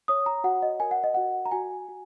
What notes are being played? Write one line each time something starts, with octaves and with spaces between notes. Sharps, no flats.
C#5 D#6
A#5
F#4 F#5
D#5
A#4 G#5
F#5
D#5
F#4 F#5
A#5
F#4 G#5
F#4